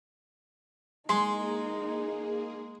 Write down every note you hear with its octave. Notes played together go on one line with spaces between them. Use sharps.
G#3 A#3 D#4 G#4 C6